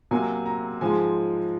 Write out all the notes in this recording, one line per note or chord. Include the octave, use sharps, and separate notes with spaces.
C3 F#3 A#3 G#5
A#5
G#2 F3 G#3 G#5